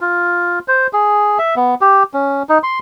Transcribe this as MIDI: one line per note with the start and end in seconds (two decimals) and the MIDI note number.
0.01 0.59 65
0.68 0.87 72
0.93 1.38 68
1.39 1.55 76
1.56 1.75 59
1.81 2.03 67
2.14 2.43 61
2.49 2.58 63
2.63 2.79 84